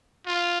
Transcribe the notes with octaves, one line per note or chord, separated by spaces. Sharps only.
F4